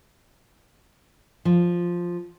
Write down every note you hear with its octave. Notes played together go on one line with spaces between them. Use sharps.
F3